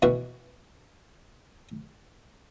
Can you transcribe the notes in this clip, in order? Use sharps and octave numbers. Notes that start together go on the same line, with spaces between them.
B2 E3 F#4